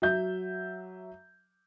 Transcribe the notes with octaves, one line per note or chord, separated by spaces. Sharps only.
F#3 E5 G6